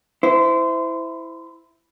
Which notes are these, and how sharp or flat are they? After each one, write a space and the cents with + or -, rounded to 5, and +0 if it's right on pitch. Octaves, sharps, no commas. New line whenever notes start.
E4 +0 C5 -25